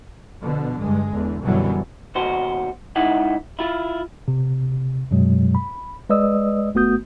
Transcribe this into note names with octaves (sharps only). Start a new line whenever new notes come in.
B2 D3 F3
G2 G#3
E2 D3
F#2 B2 D3 E3 F#3 G3
D#2 B2 F#4 C5
C#2 D#4 E4 F#5
E4 F4
C3
F#2 B2 F#3 G#3
B5
G#3 B4 D5 D#5 D#6 E6
G1 A3 B3 F#4 D#6 G6